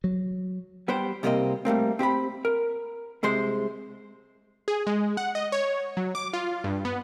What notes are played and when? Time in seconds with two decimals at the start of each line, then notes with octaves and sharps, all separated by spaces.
0.04 F#3
0.88 G3 B3 G4 C5
1.23 C2 C3 G3 A#3 C4 D#5
1.65 G3 A3 A#3 C4
1.99 C4 G4 C5 B5
2.45 A#4
3.23 C2 C3 G#3 C5 C6
4.68 G#4
4.87 G#3
5.17 F#5
5.35 D#5
5.52 C#5
5.97 F#3
6.15 D6
6.33 F4
6.64 G2
6.85 B3